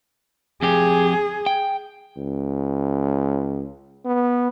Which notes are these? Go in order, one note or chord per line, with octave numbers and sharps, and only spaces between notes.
F2 G4 G#4
G5
C#2
B3